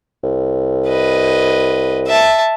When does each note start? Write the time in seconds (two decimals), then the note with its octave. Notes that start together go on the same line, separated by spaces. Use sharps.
0.24 C2
0.88 B4 D#5
2.07 E5 A5